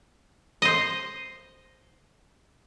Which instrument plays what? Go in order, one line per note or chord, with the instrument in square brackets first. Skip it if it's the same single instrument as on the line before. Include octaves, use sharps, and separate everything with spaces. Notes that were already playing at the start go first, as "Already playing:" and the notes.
[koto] C5 D#5